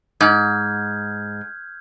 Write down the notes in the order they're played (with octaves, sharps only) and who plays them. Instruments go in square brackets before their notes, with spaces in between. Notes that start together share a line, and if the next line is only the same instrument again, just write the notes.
[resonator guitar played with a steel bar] G#2 [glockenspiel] F6 G6 G#6